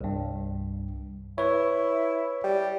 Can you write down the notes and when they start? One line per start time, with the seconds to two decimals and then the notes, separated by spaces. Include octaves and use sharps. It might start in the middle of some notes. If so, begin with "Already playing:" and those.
0.01 C2 G2
1.38 E4 B4 C#5
2.44 G3